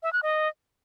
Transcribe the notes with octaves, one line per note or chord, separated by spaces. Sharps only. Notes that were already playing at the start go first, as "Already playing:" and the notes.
E5
F#6
D#5